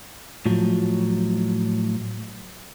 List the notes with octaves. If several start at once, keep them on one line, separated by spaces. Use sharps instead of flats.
A2 F3 F#3